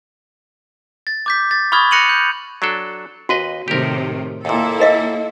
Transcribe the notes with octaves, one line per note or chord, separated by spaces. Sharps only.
A6
D6 G6 B6
A6
B5 C#6 D#6 F6 G#6 A6
F#6 A#6 C#7 D#7 F7 F#7
G6
F#3 D4 A4
D#2 F#4 B4 D#5
A2 C3 D#3 G4 A#4
D#2 A#2 A#3 E4 A4
A#4 D#5 F5